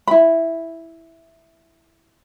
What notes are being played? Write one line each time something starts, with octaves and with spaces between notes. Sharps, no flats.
E4 B5